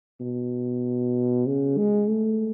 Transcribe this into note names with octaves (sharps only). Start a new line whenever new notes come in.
B2
C#3
G#3
A3